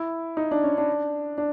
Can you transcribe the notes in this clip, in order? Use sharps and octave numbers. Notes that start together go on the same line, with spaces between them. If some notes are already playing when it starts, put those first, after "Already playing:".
Already playing: E4
D#4
D4
C#4
D4
D4